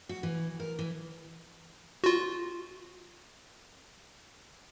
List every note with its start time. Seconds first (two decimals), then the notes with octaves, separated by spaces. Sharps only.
0.09 F#4
0.23 E3
0.60 A#4
0.79 E3
2.04 F4 F#4